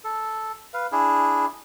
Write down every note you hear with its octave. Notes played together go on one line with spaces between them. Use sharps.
A4
B4 F5
D4 E4 G#4